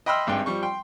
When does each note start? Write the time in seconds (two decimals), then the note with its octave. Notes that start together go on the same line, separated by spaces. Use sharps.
0.06 D#5 G5 B5 C6 E6 F6
0.27 G#1 G2 G5
0.46 F3 G3 C#6
0.63 G5 C6